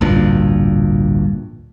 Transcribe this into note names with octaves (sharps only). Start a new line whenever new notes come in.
A1 D2 G2 A#2